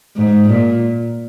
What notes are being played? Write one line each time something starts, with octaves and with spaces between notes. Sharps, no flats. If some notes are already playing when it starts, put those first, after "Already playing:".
G#2
A#2